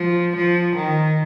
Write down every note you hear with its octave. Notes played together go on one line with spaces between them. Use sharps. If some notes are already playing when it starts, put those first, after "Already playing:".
Already playing: F3
F3
D#3